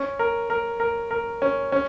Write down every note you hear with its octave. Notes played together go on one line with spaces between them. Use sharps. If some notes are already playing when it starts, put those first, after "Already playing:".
Already playing: C#4
A#4
A#4
A#4
A#4
C#4
C#4